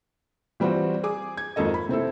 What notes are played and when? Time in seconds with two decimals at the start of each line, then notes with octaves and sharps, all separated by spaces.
0.60 E3 G3 C4 F4 F#4
1.04 G#4 D6
1.37 G#6
1.56 G#1 F2 A#3 A4 D#5
1.74 B5
1.89 C3 C4 E4 A4